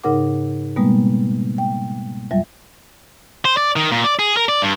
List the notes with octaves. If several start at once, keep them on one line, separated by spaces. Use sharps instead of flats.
G#2 C#3 D#4 A#4 F#5 D6
B2 G3 G#3 A#3 B3
G5
F2 F#3 G3 E5
C5
D5
D#3
A#2
D5
G#4
A#4
D5
G2